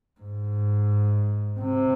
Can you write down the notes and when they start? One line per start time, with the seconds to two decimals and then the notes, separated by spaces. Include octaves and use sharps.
0.20 G#2
1.60 C3